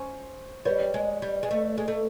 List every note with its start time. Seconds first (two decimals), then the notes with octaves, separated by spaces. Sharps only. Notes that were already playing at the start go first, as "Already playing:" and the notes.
Already playing: C#4 C5
0.65 G3 B4 C#5
0.94 G#3
1.22 G3
1.43 G#3
1.51 A3
1.78 G#3
1.88 A3